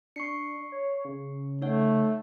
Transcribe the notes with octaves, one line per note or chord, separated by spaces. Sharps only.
D4 C#6 C7 C#7
C#5
C#3
A3 D#4 C#5 F#5